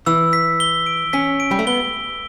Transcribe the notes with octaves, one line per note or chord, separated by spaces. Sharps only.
E3 E6
B6
G7
D7
C#4 B6
D7
G3
A3
B3 G7